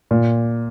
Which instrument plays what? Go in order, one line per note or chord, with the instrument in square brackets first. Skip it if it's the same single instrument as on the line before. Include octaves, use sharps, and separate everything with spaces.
[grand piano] A#2